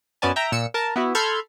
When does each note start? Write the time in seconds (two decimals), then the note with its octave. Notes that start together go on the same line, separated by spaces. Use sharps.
0.22 F#2 B3 C#4 D5 G#5 A5
0.36 E5 G5 A#5
0.52 A#2 E6 C#7
0.74 A#4 A5
0.96 B3 E4 F#4
1.15 A4 B5 C6 F6 G6 G#6